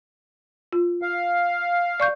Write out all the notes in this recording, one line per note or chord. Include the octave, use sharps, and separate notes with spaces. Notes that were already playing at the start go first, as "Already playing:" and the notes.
F4
F5
D5 C#6 G6